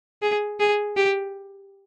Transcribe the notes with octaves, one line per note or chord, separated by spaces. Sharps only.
G#4
G#4
G4